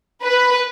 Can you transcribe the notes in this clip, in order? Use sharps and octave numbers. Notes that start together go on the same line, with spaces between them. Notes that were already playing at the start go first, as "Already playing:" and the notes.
B4